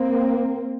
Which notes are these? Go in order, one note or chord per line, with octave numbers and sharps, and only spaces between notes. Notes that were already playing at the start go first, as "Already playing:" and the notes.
Already playing: A#3 C4